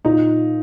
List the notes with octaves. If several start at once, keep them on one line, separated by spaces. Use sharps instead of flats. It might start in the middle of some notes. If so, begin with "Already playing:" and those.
A#2 D#4